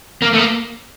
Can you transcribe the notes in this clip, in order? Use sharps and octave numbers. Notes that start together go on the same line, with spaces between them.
A#3
A3
A#3